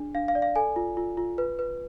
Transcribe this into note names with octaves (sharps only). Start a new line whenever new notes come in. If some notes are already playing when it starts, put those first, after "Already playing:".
Already playing: D4 G#4
D4 F5
F5
D5
F5
A4 G#5
F4
F4
F4
B4
B4